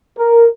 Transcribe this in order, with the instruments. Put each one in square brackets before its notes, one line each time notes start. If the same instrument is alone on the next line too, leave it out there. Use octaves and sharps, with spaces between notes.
[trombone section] A#4